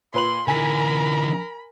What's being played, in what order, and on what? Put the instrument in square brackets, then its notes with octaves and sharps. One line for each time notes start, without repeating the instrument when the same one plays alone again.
[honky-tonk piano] A#2 B4 F#7 [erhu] C6
[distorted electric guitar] D3 E3 [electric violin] A#4 [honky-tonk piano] G#5 B6 [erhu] B5